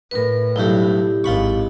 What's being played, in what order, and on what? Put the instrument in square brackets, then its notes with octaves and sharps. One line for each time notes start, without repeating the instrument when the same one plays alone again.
[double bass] A2 [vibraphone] A#4 B4
[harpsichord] B1 G2 A3 [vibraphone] E4 G4
[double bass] G#1 [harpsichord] F4 B5 C#6